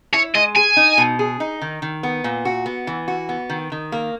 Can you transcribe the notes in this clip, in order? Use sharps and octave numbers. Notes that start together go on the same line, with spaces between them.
E4 C#5
G#3 D#5
G#4 G#5
D#4
B2
G#4
D#4
D#3
D#3
B3
A#2
F#4
B3
E3
F#4
B3
D#3
D#3
A#3